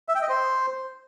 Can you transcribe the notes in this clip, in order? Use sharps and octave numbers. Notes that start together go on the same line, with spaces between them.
E5
G5
D#5
C5